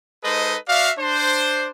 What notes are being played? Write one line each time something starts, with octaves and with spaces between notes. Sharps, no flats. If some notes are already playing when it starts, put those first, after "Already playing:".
G#3 D#4 A4 B4 C5 D#5
F#4 D5 E5 F5
D4 C5